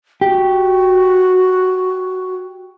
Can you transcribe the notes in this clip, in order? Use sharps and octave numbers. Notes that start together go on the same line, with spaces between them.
F#4 G4